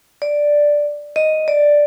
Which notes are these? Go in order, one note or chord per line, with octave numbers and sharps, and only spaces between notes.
D5
D#5
D5